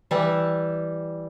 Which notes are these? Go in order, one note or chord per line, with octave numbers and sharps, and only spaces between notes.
E3 G3